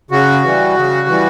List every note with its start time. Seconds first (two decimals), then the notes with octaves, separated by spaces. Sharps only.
0.11 C#3 F#4
0.44 E3 G3
0.76 C#3
1.08 E3 G3